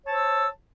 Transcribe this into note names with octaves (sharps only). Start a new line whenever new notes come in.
C5 C#5 A5 E6